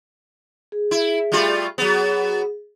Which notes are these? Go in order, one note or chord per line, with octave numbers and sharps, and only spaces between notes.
G#4
E4
G3 A3 F4
F#3 B3 G#4